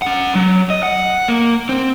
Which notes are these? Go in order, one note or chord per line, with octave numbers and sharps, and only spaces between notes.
C#4 F#5
F#3
D#5
F#5
A#3
C4